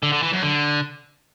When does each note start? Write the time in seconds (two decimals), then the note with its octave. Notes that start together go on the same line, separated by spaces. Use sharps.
0.03 D3
0.13 D3
0.23 E3
0.33 F#2
0.43 D3